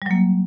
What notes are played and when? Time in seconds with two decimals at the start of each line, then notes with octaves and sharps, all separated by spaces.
0.02 G3
0.06 F#3
0.11 A#3